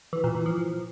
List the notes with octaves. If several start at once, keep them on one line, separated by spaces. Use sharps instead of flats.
E3
A#2
E3
F3